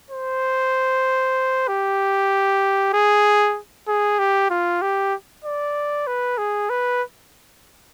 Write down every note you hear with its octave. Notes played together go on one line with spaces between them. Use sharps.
C5
G4
G#4
G#4
G4
F4
G4
D5
B4
G#4
B4